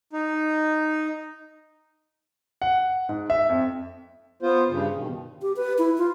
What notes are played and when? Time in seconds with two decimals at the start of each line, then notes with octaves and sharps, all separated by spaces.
0.13 D#4
2.62 F#5
3.09 G#2
3.30 E5
3.49 F2
4.42 B3 F4 C5
4.69 G2 C#3
4.96 B2 D#3
5.42 G4
5.56 B4
5.78 E4
5.98 F4